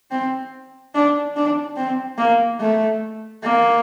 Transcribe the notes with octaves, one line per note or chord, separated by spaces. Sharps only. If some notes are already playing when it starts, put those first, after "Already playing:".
C4
D4
D4
C4
A#3
A3
A#3